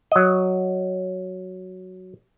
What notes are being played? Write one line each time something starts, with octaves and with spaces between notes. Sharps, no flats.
F#3 D#5